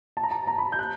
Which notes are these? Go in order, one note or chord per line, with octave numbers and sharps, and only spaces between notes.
A5
A#5
A5
A#5
B5
G6
F#6